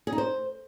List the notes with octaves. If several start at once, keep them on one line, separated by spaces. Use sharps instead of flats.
G#4
D#4
C5